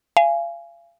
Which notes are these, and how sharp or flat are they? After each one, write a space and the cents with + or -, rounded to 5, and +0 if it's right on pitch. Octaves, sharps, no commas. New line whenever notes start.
F5 -35 G#5 +0